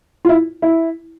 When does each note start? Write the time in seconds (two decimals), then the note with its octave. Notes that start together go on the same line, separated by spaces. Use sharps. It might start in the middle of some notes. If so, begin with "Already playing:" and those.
0.25 F4
0.29 E4
0.62 E4